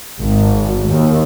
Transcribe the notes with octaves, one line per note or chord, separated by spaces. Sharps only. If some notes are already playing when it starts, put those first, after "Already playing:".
G#1
D#2